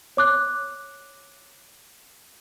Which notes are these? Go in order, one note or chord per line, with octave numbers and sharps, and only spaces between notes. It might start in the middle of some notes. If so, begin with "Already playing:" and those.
C#5 D6 F#6